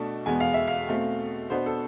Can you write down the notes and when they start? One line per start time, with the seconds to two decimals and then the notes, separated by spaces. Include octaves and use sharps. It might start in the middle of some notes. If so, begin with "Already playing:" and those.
Already playing: B2 A3 D4 A5
0.26 E2 B2 G#3 B3 G#5
0.40 F5
0.54 E5
0.68 F5
0.89 B2 A3 C4
1.50 B2 B3 D4 C5
1.66 A4